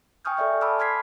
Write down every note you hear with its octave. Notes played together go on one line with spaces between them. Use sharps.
G5 G#5 C#6 D#6 F6 G6
A4 D5 E5 C#6
G#5 A5 B5 D6 E6 F6
C6 F6 G#6 B6 C7